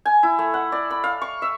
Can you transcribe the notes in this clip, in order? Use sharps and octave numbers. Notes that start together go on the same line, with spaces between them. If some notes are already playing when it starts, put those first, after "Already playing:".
G#5
E4
A3
F#5
D5
B5
F5
C#6
E5